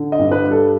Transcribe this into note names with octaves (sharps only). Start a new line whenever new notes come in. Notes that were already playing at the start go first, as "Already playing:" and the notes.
Already playing: D3
D#5
G2
B4
G3
A4